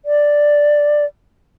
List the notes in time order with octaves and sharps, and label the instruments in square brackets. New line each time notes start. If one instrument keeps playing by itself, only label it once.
[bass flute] D5